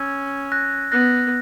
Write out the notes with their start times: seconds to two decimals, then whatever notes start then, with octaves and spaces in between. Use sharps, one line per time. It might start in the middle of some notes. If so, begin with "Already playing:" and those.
Already playing: C#4 E6 G#6
0.52 F#6 A#6
0.92 B3 F#6 A#6